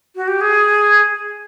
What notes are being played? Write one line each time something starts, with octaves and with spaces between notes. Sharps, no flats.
F#4
G4
G#4